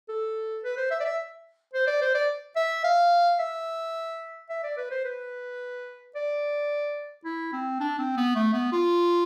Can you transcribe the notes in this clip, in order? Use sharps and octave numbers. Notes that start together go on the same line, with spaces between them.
A4
B4
C5
E5
D5
E5
C5
D5
C5
D5
E5
F5
E5
E5
D5
B4
C5
B4
D5
E4
C4
D4
C4
B3
A3
B3
F4